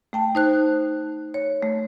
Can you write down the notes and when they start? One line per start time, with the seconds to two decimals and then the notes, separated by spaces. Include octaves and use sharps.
0.13 A3 G5 A5
0.35 D#4 C5 F#6
1.34 C#5
1.63 A3